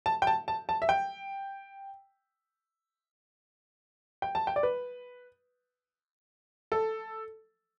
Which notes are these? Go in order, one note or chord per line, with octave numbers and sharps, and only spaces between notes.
A5
G5
A5
A5
A5
E5
G5
G5
A5
G5
D5
B4
A4